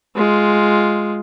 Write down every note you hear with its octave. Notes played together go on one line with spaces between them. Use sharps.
G#3 F4